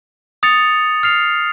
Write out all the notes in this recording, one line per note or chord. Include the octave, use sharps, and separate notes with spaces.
D#6 A6 C#7 F7
F6 C7 F7